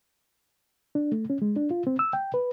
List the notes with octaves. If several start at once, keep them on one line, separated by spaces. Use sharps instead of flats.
D4
A3
C#4
G#3
D4
F4
C4
E6
G5
B4